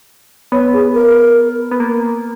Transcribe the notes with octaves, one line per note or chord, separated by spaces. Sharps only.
B3 C#5
G#4
A#4
B3
A#3